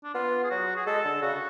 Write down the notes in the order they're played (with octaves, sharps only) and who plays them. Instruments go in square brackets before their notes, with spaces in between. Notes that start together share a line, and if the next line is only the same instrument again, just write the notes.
[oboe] D4
[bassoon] B3 [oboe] F4
[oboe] G#4
[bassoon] F#3 [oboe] F#4
[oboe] G#4
[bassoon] G#3 [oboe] A4
[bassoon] D3
[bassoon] C#3 [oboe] F#4